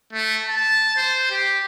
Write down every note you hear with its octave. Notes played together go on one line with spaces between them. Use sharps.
A3
A5
C5
G4